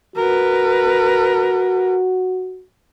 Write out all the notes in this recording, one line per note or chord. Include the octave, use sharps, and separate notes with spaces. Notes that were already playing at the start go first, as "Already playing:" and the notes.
F#4 A#4 B4